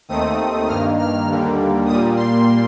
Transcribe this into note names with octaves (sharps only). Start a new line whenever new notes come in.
D#2 D#3 A3 C4 D#6
G2 D#3 A#3 F6
F6
D#2 D3 G3 A#3
A#2 G3 A#3 D#6
C6